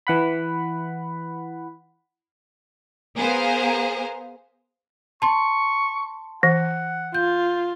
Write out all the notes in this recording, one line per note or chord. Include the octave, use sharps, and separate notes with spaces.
E3 F#5 B5
B3 G#4 A#4 C5 F5
A5 C6 C#6
E3 F#5
F4 G6